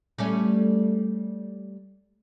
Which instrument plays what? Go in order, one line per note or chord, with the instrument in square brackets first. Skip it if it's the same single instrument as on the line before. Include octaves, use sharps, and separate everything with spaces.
[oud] G3 A3 C#4